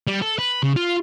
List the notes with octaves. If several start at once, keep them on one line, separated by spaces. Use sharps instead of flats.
G3
A4
B4
C#3
F4